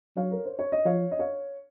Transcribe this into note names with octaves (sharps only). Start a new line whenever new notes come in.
F#3 C#5 F5
A#4
C5
C#5
D#5
F3 C#5 F5
D#5
C#5 F5